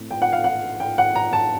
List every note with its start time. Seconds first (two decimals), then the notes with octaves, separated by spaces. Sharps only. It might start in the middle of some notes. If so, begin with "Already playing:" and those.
Already playing: A2 C4
0.11 G5
0.22 F#5
0.33 F5
0.44 F#5
0.80 G5
0.98 F#5
1.16 A#5
1.33 A5